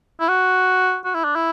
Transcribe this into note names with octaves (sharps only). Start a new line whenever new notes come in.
E4
F#4
F#4
E4
D4
E4